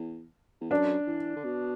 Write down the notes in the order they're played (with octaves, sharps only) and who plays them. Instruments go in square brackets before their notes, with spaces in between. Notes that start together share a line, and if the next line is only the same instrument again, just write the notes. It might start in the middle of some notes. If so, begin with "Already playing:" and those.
Already playing: [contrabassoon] E2
E2
[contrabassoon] F#2 [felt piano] D4
[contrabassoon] E3
D3
B2